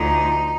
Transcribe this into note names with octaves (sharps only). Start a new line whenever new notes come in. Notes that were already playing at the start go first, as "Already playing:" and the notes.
Already playing: D2 F3 D#4